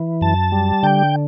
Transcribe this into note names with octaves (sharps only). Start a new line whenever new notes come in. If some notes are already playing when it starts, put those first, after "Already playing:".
Already playing: E3
F#2 A5
G3
D3 G5